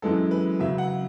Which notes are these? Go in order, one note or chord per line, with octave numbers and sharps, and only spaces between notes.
F#2 E3 G#3 B3 A4
B4
F#2 C#3 F#3 E5
F#5